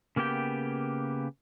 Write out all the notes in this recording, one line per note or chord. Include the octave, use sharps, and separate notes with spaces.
C#3 A#3 B3 G4 G5